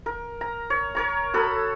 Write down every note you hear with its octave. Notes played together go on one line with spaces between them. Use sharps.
A#4
A#5
C#5
A#4 C#5 A#5
F#4 A4 B5 D#6